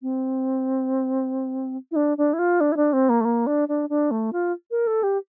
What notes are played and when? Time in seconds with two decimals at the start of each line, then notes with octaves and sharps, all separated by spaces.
0.02 C4
1.91 E4
1.96 D4
2.18 D4
2.33 E4
2.39 F4
2.60 D4
2.72 E4
2.77 D4
2.93 C4
3.09 A#3
3.21 A3
3.25 A#3
3.47 D4
3.68 D4
3.89 D4
4.11 A3
4.33 F4
4.71 A#4
4.87 A4
5.03 G4